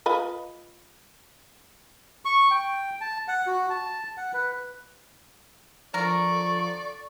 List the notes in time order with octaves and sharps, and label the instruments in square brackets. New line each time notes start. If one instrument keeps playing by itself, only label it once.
[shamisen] F4 B4 D#5
[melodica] C#6
G5
A5
F#5
F#4
A5
F#5
B4
[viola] D3 C#6 [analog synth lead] F3 [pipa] A#4 [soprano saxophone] D5